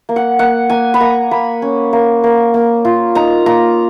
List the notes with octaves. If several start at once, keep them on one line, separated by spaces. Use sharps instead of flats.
A#3
F#5
A#3 F#5
A#3 G#5
B5
A#3 A#5
A#3 B5
C#4
A#3
A#3
A#3
F4
D#4 A#5
A#3 A#5